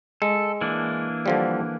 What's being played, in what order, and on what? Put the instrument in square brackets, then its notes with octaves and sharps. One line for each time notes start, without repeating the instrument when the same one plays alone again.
[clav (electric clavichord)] G#3 [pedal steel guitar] A4
[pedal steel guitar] E3 A#3 D4
[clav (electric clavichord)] D3 F3 G3